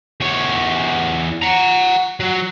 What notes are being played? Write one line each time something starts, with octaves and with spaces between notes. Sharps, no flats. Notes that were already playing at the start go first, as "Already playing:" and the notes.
E2 C#5
F#5 A#5
F#3